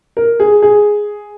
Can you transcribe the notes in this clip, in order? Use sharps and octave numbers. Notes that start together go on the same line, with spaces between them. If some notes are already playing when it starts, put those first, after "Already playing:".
A#4
G#4
G#4